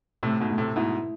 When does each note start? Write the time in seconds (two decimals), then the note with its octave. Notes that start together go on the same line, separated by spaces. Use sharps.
0.23 A2 C3 A3
0.40 G#2 B2
0.50 A3
0.58 A2 C3
0.76 G#2 B2 E4